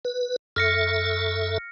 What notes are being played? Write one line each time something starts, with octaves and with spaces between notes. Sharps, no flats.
B4
F#2 A4 E5 F6 A#6 C#7